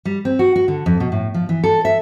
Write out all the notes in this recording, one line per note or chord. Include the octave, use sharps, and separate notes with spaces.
G3
C4
F#4
F#4
D3
F2
B2
A2
F3
E3
A4
E5